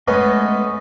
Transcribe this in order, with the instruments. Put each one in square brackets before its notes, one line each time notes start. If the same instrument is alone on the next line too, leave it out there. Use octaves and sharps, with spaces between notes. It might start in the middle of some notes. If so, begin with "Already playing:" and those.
[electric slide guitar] G#3 A3 D#5 [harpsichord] B3 C#4 B4